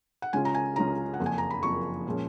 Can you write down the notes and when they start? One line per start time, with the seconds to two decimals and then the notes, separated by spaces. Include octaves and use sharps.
0.22 F#5
0.33 C#2 C#3 G#3 C#4 F4 G#5
0.45 A#5
0.55 G#5
0.76 C#2 C#3 G#3 C#4 F4 A#5
1.14 F#5
1.20 F#1 F2 F3 A#3
1.26 G#5
1.38 A#5
1.50 B5
1.63 F#1 F2 F3 A#3 C#6
2.07 A#2 F3 G#3 C#4